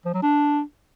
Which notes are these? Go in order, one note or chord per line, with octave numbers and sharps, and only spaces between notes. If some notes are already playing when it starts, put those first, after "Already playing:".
F3
F#3
D4